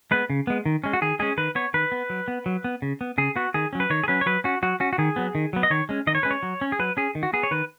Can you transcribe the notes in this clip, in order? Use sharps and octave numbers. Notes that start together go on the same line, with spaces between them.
G#3 B3 B4
C#3
G#3 B3
D#3
G#3 C#4
F#4
D#3 G#4
G#3 C#4 G#4
D#3 B4
B3 C#5
D#3 B4
B3
F#3
B3
F#3
B3
C#3
B3
C#3 G#4
B3 F#4
D#3 G#4
F#3 C#4
B4
D#3 C#5
G#4
F#3 C#4 B4
C#5
F#3 B4
C#4 F#4
F#3 F#4
C#4 F#4
F#4
D#3 G#4
F#3 B3
D#3
F#3 B3
D#5
D#3 C#5
G#3 C#4
D#3 D#5
C#5
G#3 C#4 B4
C#5
F#3
C#4
G#4
F#3 B4
C#4 G#4
D#3
F#4
B3 G#4
C#5
D#3 B4